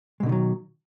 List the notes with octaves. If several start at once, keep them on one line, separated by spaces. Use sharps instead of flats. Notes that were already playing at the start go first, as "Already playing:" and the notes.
B2 D3 D#3 F#3 G#3